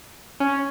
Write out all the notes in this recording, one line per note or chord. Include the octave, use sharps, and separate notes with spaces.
C#4